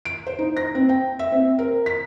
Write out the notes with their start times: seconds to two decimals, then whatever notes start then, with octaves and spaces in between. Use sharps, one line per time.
0.05 D7
0.27 C5
0.39 D#4
0.57 A#6
0.75 C4
0.89 G5
1.19 E5
1.32 C4
1.59 A#4
1.86 B6